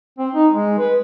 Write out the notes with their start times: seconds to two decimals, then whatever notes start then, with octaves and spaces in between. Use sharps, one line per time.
0.18 C4
0.34 D#4
0.52 G#3
0.78 B4